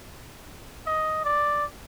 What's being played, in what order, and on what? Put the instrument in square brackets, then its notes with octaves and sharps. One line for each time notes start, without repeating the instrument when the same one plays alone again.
[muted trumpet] D#5
D5